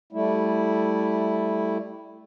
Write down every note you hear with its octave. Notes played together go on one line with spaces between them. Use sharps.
G3 A3 E4